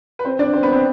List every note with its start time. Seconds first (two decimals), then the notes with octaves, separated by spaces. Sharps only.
0.19 B4
0.25 C4 C5
0.39 D4 D5
0.53 C4 C5
0.63 B3 B4
0.73 C4 C5